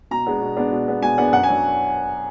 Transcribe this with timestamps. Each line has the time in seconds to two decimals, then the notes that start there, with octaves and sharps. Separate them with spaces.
0.11 B2 A#5
0.26 G#3 B3 D4
0.41 B2
0.57 G#3 B3 D4
0.72 B2
0.88 G#3 B3 D4
1.02 B2 G#5
1.18 G#3 B3 D4 F#5
1.33 F#2 F#5
1.43 G#5
1.48 F#3 D4